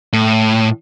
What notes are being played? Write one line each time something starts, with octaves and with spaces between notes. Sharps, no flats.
A2